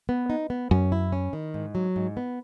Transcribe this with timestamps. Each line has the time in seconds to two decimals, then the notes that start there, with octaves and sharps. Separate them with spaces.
0.09 B3
0.30 D#4
0.50 B3
0.71 F#2 C#4
0.92 E4
1.12 C#4
1.33 D#3
1.54 G#2
1.75 F#3
1.96 G#2
2.17 B3